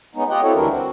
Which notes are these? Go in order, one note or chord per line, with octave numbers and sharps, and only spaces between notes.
G#3 B3 C#4 D#4
F4 G4 D#5 F#5 G5
C4 E4 F#4 A4 C#5
D2 E3 G3 D4 E4 A#4
C4 F#4